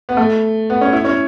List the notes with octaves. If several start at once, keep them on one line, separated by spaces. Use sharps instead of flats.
B3
A3
B3
C#4
E4
C#4